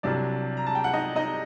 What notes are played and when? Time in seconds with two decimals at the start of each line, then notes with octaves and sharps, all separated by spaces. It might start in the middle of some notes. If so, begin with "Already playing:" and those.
0.03 C2 C3 F#3 D4 D5
0.57 A#5
0.67 A5
0.75 G5
0.84 F#5
0.93 D#4 D#5
1.16 D#4 D#5